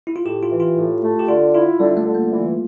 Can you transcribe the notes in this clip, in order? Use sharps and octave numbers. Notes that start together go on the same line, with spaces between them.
E4
F4
A2 G4
F4
E3
F4
A2
A3
G4
D3 F4
E4 F4
D3 G3
A3
D3
A#3
E3